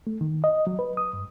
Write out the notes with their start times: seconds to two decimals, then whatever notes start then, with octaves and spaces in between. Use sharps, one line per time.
0.07 A3
0.21 D#3
0.44 D#5
0.67 F#3
0.79 B4
0.97 D#6
1.13 G2